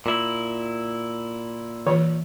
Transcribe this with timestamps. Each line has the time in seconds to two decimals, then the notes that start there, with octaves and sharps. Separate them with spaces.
0.06 A#2 E4
1.87 E3 C#5